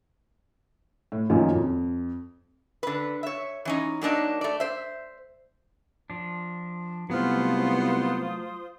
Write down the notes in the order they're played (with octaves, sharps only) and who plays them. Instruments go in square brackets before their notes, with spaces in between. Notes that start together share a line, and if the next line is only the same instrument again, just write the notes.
[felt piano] A2
F#2 A#2 D#3 F3
F2
[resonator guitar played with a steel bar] D3 B4
C#5 E5
E3 C#4 D#4
F#3 A#3 D4 D#4
A3 D5
C5 E5
[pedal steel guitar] F3 D4
[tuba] C2 [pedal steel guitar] F#3 A3 F6 [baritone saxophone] B3 [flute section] F4 C5 D#6